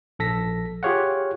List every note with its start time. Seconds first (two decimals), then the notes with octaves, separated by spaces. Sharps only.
0.19 A#1 A4 A#6 B6
0.83 F4 G4 G#4 C#5 F5 F#5